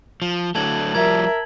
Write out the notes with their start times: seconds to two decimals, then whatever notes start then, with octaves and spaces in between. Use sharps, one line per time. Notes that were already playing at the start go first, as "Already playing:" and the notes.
0.22 F3 G7
0.55 D3 F#3 A3 A5 G#6 F#7
0.95 F3 G3 A#4 E5 G#6